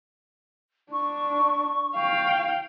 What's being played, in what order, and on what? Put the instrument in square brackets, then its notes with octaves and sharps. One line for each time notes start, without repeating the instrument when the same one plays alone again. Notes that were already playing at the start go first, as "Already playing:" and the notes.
[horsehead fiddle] D4 [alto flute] C#6
[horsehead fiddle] F5 G5